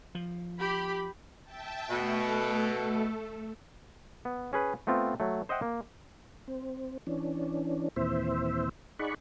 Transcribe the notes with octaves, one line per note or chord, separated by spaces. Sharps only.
F3
G4 B5
E5 G5 A5
B2 A3 A4
B3
C#4 G#4 B4
A3 B3 C4 F4
F#3 A3
C5 D#5 E5 F#5 G5
A#3
C4
E3 C#4 D4
D#2 A#2 E3 C4 C5 E5
D#4 G#4 D5 F#5 B5 C#6